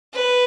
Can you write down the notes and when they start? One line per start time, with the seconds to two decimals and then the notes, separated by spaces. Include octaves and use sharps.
0.14 B4